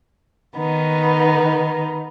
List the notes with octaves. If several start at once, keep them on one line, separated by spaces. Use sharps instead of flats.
D#3 B3 D#4